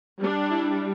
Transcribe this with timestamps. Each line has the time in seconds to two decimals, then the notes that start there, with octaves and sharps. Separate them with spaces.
0.20 G3 D4
0.51 E4